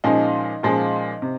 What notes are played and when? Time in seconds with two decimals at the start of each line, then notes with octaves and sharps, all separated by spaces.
0.04 A#2 F3 G#3 C#4 D#4
0.63 A#2 F3 G#3 C#4
1.22 C3